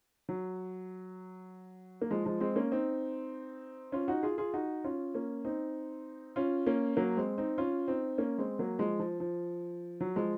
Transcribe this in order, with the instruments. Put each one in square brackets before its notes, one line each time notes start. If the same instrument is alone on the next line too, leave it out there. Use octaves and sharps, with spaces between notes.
[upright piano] F#3
A#3
F3 G#3
F3 G#3
G#3 C4
A#3 C#4
C4 D#4
C#4 F4
D#4 F#4
F4 G#4
F4 G#4
D#4 F#4
C#4 F4
A#3 C#4
C4 D#4
C#4 F4
A#3 C#4
F#3 A#3
G#3 C4
C4 D#4
C#4 F4
C4 D#4
A#3 C#4
G#3 C4
F#3 A#3
F3 G#3
F3
F3
F#3
F3 G#3